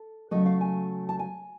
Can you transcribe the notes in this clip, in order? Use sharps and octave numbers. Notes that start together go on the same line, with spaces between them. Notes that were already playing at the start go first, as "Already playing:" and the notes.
Already playing: A4
C#3 F#3 A3 D#5
F5
G#5
A5
G#5